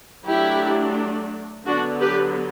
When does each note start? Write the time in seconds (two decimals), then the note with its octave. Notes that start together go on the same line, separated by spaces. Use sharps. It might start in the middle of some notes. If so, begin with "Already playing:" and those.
0.26 F#3 A3 D4 E4 G4
1.66 D3 F#3 B3 D4 F#4
2.00 G4 B4